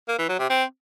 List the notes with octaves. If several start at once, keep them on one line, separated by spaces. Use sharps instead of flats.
A#3
E3
F#3
C3
C4